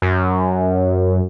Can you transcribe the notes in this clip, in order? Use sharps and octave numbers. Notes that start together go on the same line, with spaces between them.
F#2